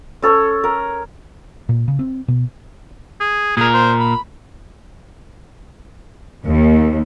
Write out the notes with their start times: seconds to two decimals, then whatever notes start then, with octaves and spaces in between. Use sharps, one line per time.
0.22 C#4 A4 C#5
0.64 A#4
1.69 A#2
1.88 C#3
1.99 C4
2.28 B2
3.21 G#4
3.57 A#2 G#4 A#4
3.74 C5
4.00 B5
6.46 D#2